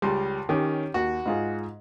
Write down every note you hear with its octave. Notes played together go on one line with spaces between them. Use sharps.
C#2 G3 C6
D#3 C#4 G4 C#5
D#2 F#4
G#2 F4 G#4